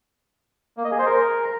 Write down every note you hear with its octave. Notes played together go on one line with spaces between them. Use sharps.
A#3
D#5
G#4
C5
A#4